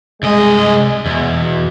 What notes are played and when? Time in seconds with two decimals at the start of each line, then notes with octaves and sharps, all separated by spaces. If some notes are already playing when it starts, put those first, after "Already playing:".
0.23 C2 G#3 D#5
1.06 E2 B2